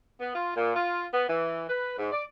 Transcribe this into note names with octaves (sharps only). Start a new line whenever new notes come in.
B3
F4
A#2
F4
B3
E3
B4
G#2
D5